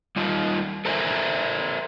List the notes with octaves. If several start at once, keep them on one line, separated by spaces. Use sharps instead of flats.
G3 D#4 F4
A4 A#4 C5 D5 E5 G#5